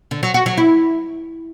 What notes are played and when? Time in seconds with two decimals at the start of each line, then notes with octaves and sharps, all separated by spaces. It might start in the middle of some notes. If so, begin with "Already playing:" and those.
0.11 D3
0.23 F#3
0.34 F#4
0.46 F#3
0.57 E4